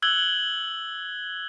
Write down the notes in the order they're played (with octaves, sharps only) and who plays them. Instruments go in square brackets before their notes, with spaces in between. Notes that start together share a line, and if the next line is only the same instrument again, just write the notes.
[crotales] E6 F#6 G#6 F#7 G7